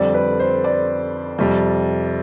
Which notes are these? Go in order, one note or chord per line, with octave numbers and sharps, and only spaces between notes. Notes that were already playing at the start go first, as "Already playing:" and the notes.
Already playing: F2 D3 G3 D5
B4
C5
D5
F2 C3 G3